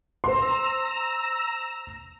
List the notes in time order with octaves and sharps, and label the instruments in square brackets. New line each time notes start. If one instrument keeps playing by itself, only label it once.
[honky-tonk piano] C5 C6 [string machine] A#5 E6